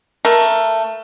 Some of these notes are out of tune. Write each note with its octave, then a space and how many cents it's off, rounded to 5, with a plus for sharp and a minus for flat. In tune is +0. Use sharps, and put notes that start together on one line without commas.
A3 +15 A#4 +15